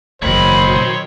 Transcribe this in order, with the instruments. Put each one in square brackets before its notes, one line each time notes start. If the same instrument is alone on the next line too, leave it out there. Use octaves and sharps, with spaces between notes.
[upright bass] F#1 E2 [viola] D#3 F#3 [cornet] C5 [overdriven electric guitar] C#5 B5